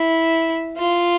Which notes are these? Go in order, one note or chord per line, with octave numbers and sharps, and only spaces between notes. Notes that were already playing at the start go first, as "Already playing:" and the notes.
Already playing: E4
F4